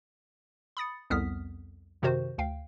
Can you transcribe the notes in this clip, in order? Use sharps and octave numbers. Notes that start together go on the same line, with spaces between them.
B5 D#6 A6 C#7
C2 F2 B3 D#6 F6 B6
F#2 C3 D#3 F#4 C5
D2 F5 G5